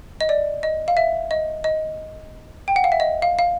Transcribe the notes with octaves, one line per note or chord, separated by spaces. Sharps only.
D#5
D5
D#5
F5
E5
D#5
D#5
G5
F#5
F5
E5
D#5
F5
F5